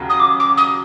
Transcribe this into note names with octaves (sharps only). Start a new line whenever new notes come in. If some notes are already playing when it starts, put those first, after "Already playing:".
Already playing: D#2 C#3 F#3
D#6
D6
D6
D#6